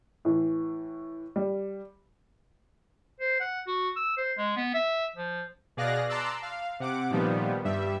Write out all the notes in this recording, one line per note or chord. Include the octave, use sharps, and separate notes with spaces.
A2 E3
G3
C5
F#5
F#4
E6
C5
G#3
B3
E5
F3
B2 G#4 D5 F5 F#6 A#6
A5 A#5 C6 D6 E6 F#6
F5
C3 F#5 D6
A#2 D#3 F3 G3 B3
G2 G3 E5